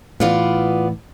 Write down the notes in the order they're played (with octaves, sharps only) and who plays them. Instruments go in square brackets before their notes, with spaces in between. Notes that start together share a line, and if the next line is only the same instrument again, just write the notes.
[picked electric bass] A2 E3 [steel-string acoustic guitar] B3 F4 D5